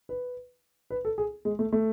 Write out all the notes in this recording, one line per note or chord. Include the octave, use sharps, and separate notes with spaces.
B4
B4
A4
G#4
G#3
A3
A3